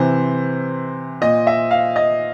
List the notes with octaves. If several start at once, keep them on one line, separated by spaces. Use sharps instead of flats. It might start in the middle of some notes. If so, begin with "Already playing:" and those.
Already playing: C3 E3 C5
A#2 D#5
E5
F5
D#5